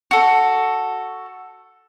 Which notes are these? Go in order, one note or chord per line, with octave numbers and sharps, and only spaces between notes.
F#4 A4